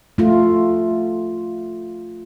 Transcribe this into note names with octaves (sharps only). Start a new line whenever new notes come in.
A3 F4